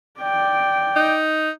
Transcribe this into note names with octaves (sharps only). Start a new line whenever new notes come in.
D5 G5
D#4